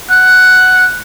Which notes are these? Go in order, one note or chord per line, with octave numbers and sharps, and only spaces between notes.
F#5